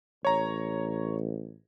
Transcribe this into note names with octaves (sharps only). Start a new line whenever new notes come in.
A1 C#5 A#5